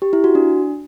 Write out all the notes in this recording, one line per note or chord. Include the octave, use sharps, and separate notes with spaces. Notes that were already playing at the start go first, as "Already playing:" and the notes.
G4
E4
F#4
D4